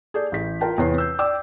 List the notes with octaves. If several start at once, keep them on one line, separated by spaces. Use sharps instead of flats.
G#4 A4 D5 G6
A1 B6
F4 A#4 G5 A5
E2 C3 C4 B4 C#5 C7
E6 G6
D5 G5 D6 E6